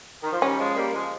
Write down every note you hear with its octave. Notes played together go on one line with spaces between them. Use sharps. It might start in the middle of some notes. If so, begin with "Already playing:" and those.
D#3
F3
D#3 G3 C#4
F3 G#3
G3 A#3
F3 G#3